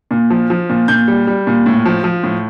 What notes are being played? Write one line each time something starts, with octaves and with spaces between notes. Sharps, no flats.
A#2
F3
F3
A#2
A#2 G6
G3
G3
A#2
A2
F3
F3
A2